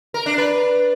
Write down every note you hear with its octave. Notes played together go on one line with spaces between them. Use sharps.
A#4
D4
B4